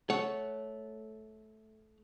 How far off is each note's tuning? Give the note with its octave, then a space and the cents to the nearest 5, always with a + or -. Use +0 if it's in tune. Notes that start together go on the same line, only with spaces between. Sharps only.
A3 -15 C#5 +0 F#5 +0